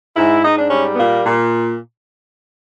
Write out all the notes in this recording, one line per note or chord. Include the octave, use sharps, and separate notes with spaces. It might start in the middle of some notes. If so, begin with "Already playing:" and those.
G#2 E4
G#2 D#4
D4
G3 C#4
B3
A#2 A#3
A#2